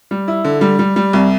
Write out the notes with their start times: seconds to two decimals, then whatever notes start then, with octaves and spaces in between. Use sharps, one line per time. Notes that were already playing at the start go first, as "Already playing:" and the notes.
0.11 G3
0.28 E4
0.44 D3
0.61 G3
0.79 G3
0.96 G3
1.13 C2